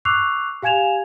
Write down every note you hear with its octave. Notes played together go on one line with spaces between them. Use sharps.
C#6 D6 E6 F#6 C7 F7
G4 F5 G#5 G#6 E7 F7